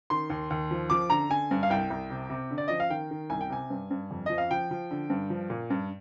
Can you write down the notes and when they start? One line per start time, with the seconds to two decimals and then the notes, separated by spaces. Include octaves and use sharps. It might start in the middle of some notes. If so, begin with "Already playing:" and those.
0.10 D#3 C6
0.30 D#2
0.50 D#2
0.71 F3
0.90 F3 D6
1.10 D3 A#5
1.30 D3 G#5
1.51 G2
1.63 F5
1.70 C2 G5
1.90 C2
2.10 C3
2.30 C3
2.51 D3
2.58 D5
2.68 F3 D#5
2.80 F5
2.90 D#3 G5
3.11 D#3
3.30 C2 G#5
3.41 G5
3.50 C3 G#5
3.70 G2
3.91 G2
4.11 F2
4.26 F3 D#5
4.38 F5
4.51 F3 G5
4.71 F3
4.91 D3
5.10 G2
5.30 F3
5.50 A#2
5.70 G2